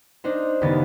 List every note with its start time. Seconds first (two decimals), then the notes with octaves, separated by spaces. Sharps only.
0.24 D4 D#4 C5
0.61 F#1 D#2 C#3 B3 A6